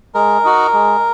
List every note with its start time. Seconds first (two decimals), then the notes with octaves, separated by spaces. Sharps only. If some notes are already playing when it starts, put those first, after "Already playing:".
0.14 G#3 A#4
0.44 D#4 F#4
0.73 G#3